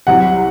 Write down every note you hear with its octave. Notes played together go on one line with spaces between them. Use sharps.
C2 C3 F#3 F#5